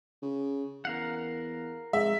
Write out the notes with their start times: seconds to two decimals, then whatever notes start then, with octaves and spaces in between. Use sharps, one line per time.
0.22 C#3
0.85 E2 A#4 F5 F#5
1.93 F1 G#3 E5